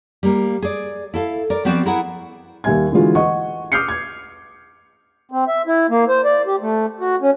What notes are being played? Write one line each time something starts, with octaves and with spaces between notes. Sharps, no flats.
G3 A#3
G#4 D5
E4 A4 F5
A#4 D5
F3 B3 C4 F#4 D5
E4 G#4 A#4 B4 F#5
D#2 G3 E5 G#5 G#6
D3 E3 G#3 F4 F#4
D#5 F#5 C#6
D6 D#6 F6 G6 C7 C#7
G#6
C4
E5
E4
A#3
C5
D5
G4
A3
F#4
C#4